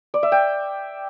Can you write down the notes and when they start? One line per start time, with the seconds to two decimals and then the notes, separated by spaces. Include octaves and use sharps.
0.14 D5
0.23 E5
0.32 G5